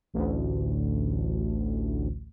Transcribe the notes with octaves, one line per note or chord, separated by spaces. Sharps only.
A1 D2